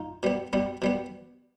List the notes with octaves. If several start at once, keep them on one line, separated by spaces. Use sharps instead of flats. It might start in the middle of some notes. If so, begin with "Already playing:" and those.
Already playing: D#4 F4
B2 G3 B3
B2 G3 B3
B2 G3 B3